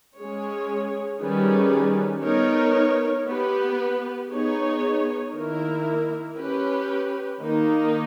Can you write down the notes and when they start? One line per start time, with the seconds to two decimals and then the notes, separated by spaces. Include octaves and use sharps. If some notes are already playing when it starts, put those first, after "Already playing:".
0.18 G#3 C#4 G#4 C#5
1.21 D#3 G3 C#4 G#4 B4
2.24 B3 D#4 A#4 C#5
3.28 B3 G4 B4
4.31 B3 D#4 G#4 C#5
5.34 D#3 A#3 E4 A#4
6.36 C#4 G4 B4
7.40 D#3 A#3 D#4